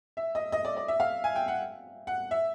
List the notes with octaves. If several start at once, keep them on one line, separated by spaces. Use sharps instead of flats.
E5
D#5
D#5
D5
D5
E5
F5
G#5
G5
F#5
F#5
E5